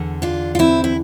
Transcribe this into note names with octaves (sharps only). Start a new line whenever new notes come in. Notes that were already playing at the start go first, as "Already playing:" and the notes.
Already playing: E2 D3
D4 F4
F4
C4 E4
E4